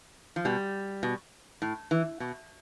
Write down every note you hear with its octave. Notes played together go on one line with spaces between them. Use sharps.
F3
B2 G3
B2
A2
E3
B2